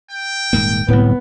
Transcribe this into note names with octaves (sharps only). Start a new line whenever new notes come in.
G5
D#1 G#2 A#3
D1 C2 A2 B3